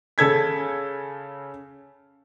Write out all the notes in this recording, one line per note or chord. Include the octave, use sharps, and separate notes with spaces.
C#3 A4 G#6 B6